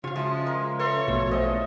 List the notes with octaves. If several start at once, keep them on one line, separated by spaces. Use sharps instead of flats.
C#3 E3 F3 F4 F#4 C#5 F5
F3 G#3 E5 C6 D#6
A#4
A4 B4 C#5 E5 C6
A#1 B2 A3 F#4
E2 C#4 C5 C#5 D#5 E5 A5